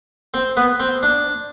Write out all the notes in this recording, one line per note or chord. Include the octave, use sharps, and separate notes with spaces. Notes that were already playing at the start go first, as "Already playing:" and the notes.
C4
B3
C4
D4